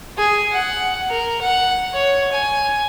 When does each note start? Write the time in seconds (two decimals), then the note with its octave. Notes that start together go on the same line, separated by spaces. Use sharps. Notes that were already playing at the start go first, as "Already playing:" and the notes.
0.18 G#4
0.52 F#5
1.09 A#4
1.42 F#5
1.94 C#5
2.32 G#5